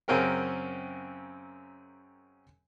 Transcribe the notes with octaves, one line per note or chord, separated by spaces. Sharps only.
F#2 C#3 C4 C#4 A#4 G5